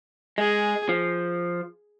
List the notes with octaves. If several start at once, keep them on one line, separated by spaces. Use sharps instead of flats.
G#3 G#4
F3